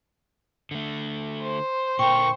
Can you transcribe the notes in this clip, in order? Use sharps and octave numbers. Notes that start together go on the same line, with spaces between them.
D3 A3
C5
A#2 D3 A#4 G5 C#6